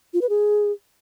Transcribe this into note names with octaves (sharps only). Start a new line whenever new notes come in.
F4
B4
G#4